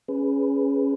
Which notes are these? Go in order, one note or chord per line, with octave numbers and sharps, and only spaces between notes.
C#4 G#4 B4